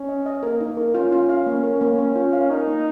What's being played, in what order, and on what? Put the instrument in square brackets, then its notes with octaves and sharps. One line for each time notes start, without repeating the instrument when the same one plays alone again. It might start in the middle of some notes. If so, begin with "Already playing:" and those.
Already playing: [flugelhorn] C#4
[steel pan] D#5
D#5
[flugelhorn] A#3 [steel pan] A#4
[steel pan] D#4
A#4
[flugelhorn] C#4 [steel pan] F4
[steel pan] F4
F5
A#3
A#4
A#3
A#3
F4
F5
[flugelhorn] D#4 [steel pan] A#4
[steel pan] A#3